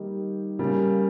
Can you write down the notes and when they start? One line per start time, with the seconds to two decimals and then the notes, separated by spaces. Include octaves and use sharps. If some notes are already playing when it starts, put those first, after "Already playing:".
Already playing: D#3 G3 A#3 D#4 G4
0.59 C#3 G3 A#3